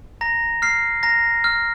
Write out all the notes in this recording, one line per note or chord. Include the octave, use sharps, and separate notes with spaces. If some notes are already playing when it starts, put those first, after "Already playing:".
A#5 A#6
F6 C7
A#5 A#6
F6